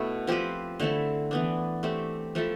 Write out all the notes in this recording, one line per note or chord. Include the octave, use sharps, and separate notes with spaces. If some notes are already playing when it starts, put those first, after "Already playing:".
Already playing: B2 A3 E4
F3 C4 G4 B4
D3 A3 C4 E4
E3 B3 D4
A3 C4 G4
F3 A3 E4 A4